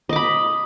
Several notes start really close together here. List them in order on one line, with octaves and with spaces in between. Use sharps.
D#5 D6 B5